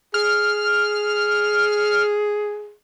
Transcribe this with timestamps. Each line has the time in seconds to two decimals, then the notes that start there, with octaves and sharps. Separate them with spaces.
0.14 G#4 F6